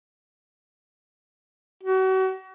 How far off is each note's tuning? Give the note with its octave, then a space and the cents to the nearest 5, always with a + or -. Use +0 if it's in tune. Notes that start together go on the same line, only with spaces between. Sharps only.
F#4 +35